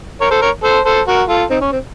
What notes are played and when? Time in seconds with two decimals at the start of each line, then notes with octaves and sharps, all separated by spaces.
0.21 A#4 C#5
0.31 A4 C5
0.42 A#4 C#5
0.63 A4 C5
0.85 A4 C5
1.07 F#4 A#4
1.29 F4 A4
1.50 C4 D#4
1.61 C#4
1.72 C4